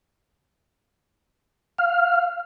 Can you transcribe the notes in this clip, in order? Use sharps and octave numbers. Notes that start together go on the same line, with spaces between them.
F5